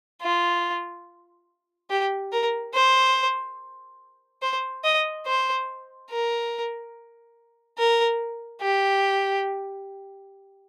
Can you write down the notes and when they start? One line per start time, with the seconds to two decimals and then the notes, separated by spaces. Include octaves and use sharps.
0.22 F4
1.90 G4
2.32 A#4
2.74 C5
4.42 C5
4.84 D#5
5.26 C5
6.10 A#4
7.78 A#4
8.61 G4